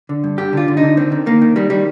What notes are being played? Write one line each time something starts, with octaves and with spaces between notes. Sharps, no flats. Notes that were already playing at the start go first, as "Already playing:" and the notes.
D3
G2
D3 G4
D3 F4
D3
D#4
D3
D#3 C4
D#3
D#3 A#3
D#3
D#3 G3
D#3 G3